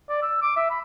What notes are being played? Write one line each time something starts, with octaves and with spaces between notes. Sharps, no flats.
D5
E6
D6
E5
B5